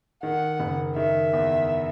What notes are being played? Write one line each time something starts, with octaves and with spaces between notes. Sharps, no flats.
D#3 F#5
F#1
D#3 E5
E2